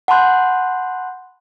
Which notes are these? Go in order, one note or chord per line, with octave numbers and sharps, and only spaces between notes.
F#5 A5 B5 C6 F#6 G6